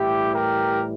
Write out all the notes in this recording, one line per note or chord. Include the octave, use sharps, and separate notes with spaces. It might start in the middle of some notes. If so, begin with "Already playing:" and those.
Already playing: A2 E3 G3 E4 G4
G4 A#4